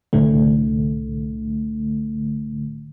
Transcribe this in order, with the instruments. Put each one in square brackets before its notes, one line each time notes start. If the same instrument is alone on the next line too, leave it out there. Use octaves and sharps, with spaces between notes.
[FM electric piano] C2 A2 D3 A3